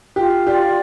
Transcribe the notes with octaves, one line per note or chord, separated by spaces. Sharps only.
F4 G4
G4 D5